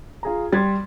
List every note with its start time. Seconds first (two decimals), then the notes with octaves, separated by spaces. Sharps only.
0.23 F4 G#4 A#5
0.53 G3 C6 G#6 A6